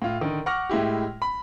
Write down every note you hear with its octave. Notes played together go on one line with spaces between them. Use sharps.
A2 F4
D3 D#3
F#5 C#6 D6 F6 A#6
A2 G#3 E4 G4
B5